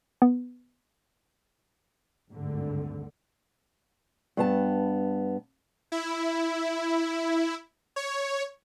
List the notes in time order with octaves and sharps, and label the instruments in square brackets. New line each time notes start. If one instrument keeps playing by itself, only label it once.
[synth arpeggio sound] B3
[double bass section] G#1 D2 G2 D3
[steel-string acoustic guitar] G2 B3 A5
[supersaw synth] E4
C#5